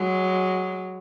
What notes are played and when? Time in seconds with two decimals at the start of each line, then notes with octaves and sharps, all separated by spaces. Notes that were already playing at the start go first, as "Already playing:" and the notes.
Already playing: F#3 G#3